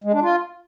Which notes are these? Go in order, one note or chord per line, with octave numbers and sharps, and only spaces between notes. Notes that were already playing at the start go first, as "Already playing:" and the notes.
G#3
D4
F4